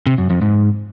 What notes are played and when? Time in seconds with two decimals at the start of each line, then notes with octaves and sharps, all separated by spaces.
0.06 C3
0.18 F#2
0.30 F2
0.41 G#2